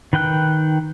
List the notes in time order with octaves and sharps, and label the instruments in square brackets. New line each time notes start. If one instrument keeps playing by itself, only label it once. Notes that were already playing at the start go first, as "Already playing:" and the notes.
[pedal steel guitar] D#3 B4 G5 F#6